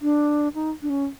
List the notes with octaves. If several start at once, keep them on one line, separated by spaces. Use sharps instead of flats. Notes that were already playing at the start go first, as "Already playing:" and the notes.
D4
D#4
D4
C#4